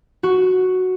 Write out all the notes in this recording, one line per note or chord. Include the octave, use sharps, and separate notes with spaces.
F#4